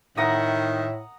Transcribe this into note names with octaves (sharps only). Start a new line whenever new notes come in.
A2 D#3 E5 F#5 A#5 D#6